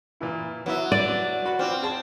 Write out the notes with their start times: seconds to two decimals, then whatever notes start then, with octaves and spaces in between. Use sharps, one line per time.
0.21 A#2 E3 E4
0.66 F#3 B3 E4 E5
0.92 D5
1.45 F#4 B4 B5
1.59 C4 F4 D5 F6
1.82 G#4 A5 C6